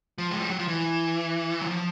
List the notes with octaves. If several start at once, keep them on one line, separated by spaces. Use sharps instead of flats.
F3
G#3
G3
F#3
F3
E3
F#3
F3